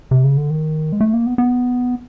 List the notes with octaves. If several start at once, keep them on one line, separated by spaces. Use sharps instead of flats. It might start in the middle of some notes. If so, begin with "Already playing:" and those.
C3
C#3
D3
D#3
G#3
A3
A#3
B3
B3